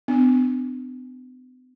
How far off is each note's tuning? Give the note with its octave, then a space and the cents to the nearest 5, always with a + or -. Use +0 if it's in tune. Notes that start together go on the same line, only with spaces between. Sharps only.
B3 +45 D4 +20